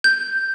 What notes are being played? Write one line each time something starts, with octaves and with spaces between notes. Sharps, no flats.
G6